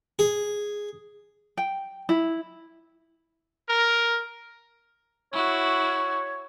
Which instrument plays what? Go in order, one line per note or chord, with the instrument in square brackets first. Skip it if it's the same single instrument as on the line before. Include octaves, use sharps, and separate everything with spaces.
[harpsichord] G#4
[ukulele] G5
E4
[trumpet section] A#4
[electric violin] E4 F#4 [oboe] C#5